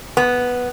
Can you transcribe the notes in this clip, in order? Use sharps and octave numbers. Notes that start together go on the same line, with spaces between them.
B3